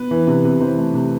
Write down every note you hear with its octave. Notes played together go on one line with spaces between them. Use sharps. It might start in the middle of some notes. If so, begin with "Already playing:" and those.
Already playing: B3 B4
E3
C3
C3
E3 C4 C5
A3
C3